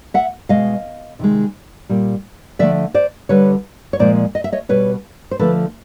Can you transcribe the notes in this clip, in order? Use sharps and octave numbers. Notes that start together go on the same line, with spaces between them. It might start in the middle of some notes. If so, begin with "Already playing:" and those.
E5 F#5
B2 G#3 D#5 F5
C3 D#3 G#3
A#2 G3
D3 F3 A3 D5 E5
C5 D5
D3 G3 B4 C#5
C#5
A#2 F3 G#3 C5 D5
D#5
E5
C#5 D#5
B2 G3 B4 C#5
C5
D3 F3 A3 A4 B4